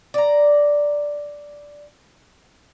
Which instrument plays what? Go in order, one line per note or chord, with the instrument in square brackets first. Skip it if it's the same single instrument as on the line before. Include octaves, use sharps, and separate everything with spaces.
[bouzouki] D5 A#5